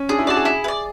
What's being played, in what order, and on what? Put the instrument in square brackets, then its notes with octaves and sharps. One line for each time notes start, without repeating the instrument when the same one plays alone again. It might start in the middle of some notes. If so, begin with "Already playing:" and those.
Already playing: [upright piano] C#4
[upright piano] D4 [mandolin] G#4
[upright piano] E4
[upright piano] F#4 [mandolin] D5 A5
[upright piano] G#4
[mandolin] E4
B4
D5